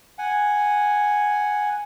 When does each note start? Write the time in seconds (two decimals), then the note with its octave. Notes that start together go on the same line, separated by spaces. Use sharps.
0.18 F#5 G#5